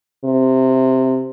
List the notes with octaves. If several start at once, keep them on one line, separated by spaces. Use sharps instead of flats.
C3